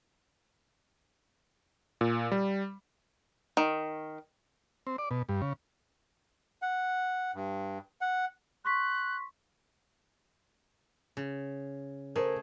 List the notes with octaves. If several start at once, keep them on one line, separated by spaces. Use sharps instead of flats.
A#2
G3
D#3
C4
D5
B2
G2
C#3
F#5
G2
F#5
C6 C#6 F#6 B6
C#3
A3 G#4 A#4 C5